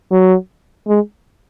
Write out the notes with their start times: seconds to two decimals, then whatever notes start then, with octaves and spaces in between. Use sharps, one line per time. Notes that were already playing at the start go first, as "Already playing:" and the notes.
0.11 F#3
0.87 G#3